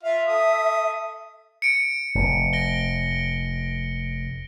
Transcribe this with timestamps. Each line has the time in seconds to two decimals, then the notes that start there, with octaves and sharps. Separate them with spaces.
0.03 F4 E5 F5
0.27 A4 D#6
1.62 C#7 D7
2.15 F1
2.53 A#6 D7 G7